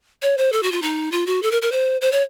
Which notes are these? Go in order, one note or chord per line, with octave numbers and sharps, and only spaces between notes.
C#5
C5
A4
F#4
F4
D#4
F4
F#4
A4
A#4
A#4
C5
C5
C#5